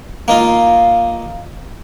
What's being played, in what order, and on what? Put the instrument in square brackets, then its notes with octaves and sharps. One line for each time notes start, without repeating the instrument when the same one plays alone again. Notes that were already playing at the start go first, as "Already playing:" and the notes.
[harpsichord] A#3 D#4 F4